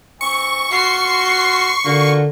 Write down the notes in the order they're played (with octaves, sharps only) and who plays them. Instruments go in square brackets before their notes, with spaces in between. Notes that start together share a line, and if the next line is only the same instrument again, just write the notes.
[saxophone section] E3 C4 [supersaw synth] C#6
[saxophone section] F4 F#4 [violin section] C6 C7
[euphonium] D3 [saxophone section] A#3 F4 F#4